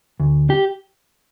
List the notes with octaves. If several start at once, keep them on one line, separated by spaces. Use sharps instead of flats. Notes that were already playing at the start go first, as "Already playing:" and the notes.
D2
G4